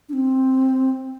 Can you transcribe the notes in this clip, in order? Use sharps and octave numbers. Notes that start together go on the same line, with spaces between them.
D4
C4